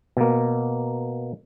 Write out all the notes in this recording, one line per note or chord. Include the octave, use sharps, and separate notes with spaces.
B2 A#3